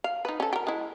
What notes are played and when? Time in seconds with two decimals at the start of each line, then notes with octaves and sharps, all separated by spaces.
0.04 F5
0.25 D#4 B4
0.40 C#4 A4
0.53 G4 A#4
0.67 G#3 E4